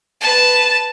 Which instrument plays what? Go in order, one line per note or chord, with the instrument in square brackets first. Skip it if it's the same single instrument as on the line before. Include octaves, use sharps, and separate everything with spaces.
[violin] B4 A5